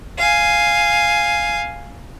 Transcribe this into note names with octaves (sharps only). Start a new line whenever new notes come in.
F5 G#5